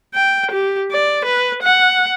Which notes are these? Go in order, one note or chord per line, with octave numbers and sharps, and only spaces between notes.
G5
G4
D5
B4
F#5